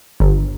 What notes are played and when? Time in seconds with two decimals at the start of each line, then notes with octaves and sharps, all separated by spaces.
0.20 G1